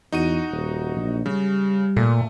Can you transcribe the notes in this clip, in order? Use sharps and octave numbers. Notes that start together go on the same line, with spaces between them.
E2 D#4 F#4 D#7
D#1
A#1
C#3 G3
A#2 A3